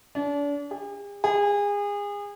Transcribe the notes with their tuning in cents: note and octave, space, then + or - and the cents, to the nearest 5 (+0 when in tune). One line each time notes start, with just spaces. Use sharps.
D4 -35
G#4 -45
G#4 -30